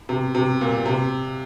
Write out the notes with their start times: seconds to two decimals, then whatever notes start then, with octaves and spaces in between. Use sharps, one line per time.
0.09 C3
0.35 C3
0.61 A#2
0.86 C3